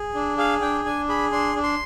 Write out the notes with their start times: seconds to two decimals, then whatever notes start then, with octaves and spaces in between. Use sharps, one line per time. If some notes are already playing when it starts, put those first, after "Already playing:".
Already playing: G#4
0.14 D4
0.38 G#4 F5
0.61 D4 G5
0.85 D4 G#5
1.09 G#4 B5
1.32 D4 C6
1.56 D4
1.63 C6